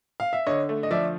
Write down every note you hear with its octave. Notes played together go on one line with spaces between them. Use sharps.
F5
E5
D3 C#5 D#5
A3
D#5
F3 D5 E5